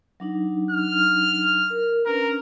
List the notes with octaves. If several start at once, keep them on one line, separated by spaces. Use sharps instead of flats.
F#3 D4 D#4
F6
A#4
C#4 D4 A#4 B4